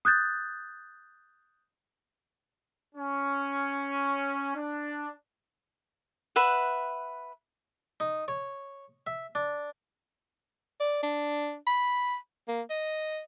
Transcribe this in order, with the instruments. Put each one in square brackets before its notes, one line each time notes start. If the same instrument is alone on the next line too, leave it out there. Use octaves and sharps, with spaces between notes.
[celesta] D#6 F#6 G6 A6
[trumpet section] C#4
D4
[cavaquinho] B4 E5 F#5
[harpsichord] D#4
C#5
E5
D4
[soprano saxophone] D5
D4
B5
A#3
D#5